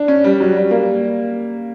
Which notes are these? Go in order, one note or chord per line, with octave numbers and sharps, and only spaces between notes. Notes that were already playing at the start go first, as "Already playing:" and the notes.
Already playing: D4
C#4
G3
F#3
G3
A#3